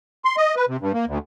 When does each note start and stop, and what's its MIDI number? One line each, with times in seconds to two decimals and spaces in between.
0.25 0.36 84
0.37 0.55 75
0.56 0.65 71
0.68 0.77 48
0.80 0.92 43
0.94 1.05 58
1.06 1.18 38